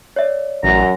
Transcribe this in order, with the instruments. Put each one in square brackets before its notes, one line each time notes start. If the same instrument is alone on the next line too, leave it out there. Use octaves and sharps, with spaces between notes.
[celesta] C#5 D5 E5
[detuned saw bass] A1 [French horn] F#2 [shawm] A#5